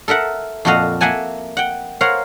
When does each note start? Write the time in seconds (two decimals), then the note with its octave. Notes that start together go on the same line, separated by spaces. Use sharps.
0.08 A4 A#4 E5 F#5
0.65 F2 A#2 F#4 A4 D#5 F5
1.01 A#3 E5 F#5 G#5 A5
1.57 F#5 G5
2.01 A#4 C5 C#5 F5 F#5